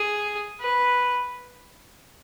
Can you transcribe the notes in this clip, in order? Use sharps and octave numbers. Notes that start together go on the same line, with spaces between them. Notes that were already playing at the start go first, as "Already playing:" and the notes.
Already playing: G#4
B4